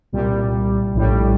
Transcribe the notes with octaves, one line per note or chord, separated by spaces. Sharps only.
C2 A#2 G3
A#1 A2 G3